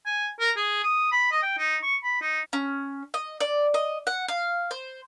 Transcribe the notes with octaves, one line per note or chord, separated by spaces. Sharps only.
G#5
A#4
G#4
D#6
B5
D#5
G5
D#4
C#6
B5
D#4
C#4
D#5
D5
D#5
F#5
F5
C5